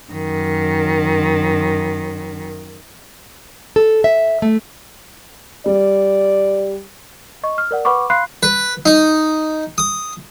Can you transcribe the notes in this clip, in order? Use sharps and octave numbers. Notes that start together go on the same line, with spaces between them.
F#2 D#3
A4
E5
A3
G3 D5
D#5 C#6
F6
A#4 D5 F#5
B4 F#5 B5 C#6 D6
F5 B5 C6 F#6 C7
B4
D#4
D#6